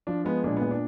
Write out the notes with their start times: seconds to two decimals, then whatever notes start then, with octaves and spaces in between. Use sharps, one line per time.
0.07 F3 D4
0.25 G#3 B3
0.44 A#2 D4
0.57 A#2 B3
0.71 D4